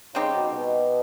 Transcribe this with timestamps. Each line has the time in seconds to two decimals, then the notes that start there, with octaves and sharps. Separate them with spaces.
0.15 C#3 G3 C4 D#4 G4
0.34 B2
0.52 B2